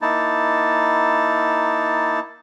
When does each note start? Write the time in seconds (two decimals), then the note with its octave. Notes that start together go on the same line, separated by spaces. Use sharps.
0.02 A#3 D#4 E4 A5